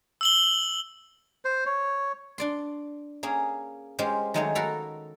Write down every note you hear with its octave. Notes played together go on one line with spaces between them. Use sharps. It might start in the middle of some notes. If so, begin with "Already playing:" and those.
E6 F#7 G7
C5
C#5
D4 D5 C6
A#3 C#4 G#4
G#3 C#4 F4 G4 C5
D#3 F#3 G#3 A3 G#4 C#5
F#4 A4 A#4 F5 B5